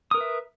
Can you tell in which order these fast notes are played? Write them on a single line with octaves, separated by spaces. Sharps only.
D#6 A#4 B4 E5